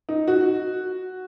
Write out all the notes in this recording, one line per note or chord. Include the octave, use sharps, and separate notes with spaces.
D#4
F#4